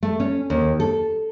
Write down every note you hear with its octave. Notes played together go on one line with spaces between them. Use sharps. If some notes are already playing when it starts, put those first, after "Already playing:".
A3
C#4
D#2
A4